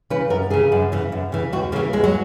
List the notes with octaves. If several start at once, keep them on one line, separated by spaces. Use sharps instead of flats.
C#3 E3 B4
F#2 A#4
C#3 E3 G#4
F#2
C#3 E3
F#2
C#3 E3
D#2 F#4
C#3 E3 A#3
D#2 G#3
F#3